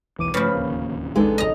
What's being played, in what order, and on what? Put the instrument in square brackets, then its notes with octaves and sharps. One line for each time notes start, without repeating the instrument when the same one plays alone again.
[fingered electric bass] B1 E2 [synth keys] E3 D6 D#7
[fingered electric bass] G2 F#3 A3 [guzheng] C#3 F3 [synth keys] B4 B5
[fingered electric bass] D1 D#2 [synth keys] A#3
[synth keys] A1 D#4 A4 [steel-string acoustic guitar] G#3 B3 D4
[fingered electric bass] E1 C#2 F#2 [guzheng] D#5 A#5